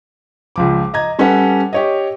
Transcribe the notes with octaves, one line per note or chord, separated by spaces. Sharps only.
C#2 F3 D6
D#5 A#5 G#6
G3 C#4 A4 B4 F#5
G4 C#5 D#5